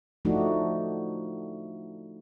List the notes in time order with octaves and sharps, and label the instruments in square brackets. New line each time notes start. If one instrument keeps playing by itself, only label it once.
[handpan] F3 A3 D4 D#4 F#4